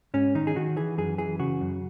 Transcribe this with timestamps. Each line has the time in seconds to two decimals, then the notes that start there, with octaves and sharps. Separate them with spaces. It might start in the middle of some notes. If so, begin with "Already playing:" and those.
0.14 G#2 C#4
0.35 D#3 D#4
0.47 G#4
0.56 D#3 F#4
0.76 E3 G#4
0.98 F#2 G#4
1.18 E3 G#4
1.39 C#3 F#4
1.61 F#2